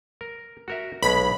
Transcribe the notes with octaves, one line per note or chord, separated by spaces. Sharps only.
A#4
F#4 A#4 E5
B1 B2 G#3 B5